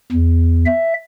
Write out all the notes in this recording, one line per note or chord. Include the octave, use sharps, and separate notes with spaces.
E2
E5